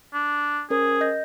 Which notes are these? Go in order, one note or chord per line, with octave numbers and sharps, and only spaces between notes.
D4
C#4 G#4 A#4 C5
D#5 G6 A#6